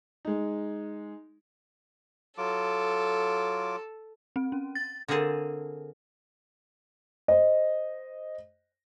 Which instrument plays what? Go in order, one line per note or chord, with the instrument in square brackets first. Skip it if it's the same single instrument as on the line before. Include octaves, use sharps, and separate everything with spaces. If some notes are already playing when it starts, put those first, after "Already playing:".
[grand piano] G#3 D#4
[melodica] F#3 F4 D6 [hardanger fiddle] A4
[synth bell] C4
C#4
A6
[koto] D3 A#3 C4 G#4 A5
[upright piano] C5 D#5